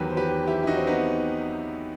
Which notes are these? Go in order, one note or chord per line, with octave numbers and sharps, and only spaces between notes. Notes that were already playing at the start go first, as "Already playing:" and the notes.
Already playing: E2 D#3 F#3 G4 B4
C5
G4 B4
E4 G4
E4
D#4 F#4
C4
B3 D#4